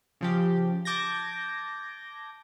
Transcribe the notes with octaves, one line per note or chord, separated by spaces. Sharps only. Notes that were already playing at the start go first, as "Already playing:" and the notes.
C#3 F3 G4
A5 D6 G6 G#6 A#6